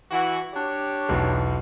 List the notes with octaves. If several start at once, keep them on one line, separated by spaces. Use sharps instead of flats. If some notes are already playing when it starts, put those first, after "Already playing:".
E3 F#4
D4 G4 C#5
B1 E2